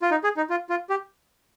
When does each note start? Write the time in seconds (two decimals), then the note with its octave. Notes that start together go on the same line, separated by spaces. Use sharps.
0.02 F4
0.11 D#4
0.24 G#4
0.37 D#4
0.50 F4
0.70 F4
0.89 G4